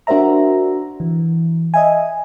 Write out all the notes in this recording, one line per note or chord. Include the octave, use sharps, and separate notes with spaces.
D4 F#4 A#4 C5 E5 A#5
E3
D#5 E5 G#5